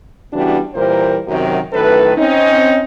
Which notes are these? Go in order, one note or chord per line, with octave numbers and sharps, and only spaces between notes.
C#3 E3 G3 B3 D4 F#4
A#2 E3 G3 A#4 C5
F#2 C3 D#3 F#3
F#2 A2 D#3 A4 B4
C4 C#4 D#4